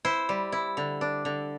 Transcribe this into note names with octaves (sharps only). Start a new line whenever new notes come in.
E4 C5
G3
E4
D3
D4
D3